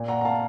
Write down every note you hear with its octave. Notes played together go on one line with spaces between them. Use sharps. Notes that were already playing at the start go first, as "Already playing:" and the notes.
Already playing: A#2
F#5 A#5
A#5
F5 A5